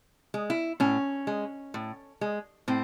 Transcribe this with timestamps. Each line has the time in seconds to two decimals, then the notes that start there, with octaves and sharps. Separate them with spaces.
0.34 G#3
0.50 E4
0.80 A2 C#4
1.27 G#3
1.74 A2
2.21 G#3
2.68 A2 C4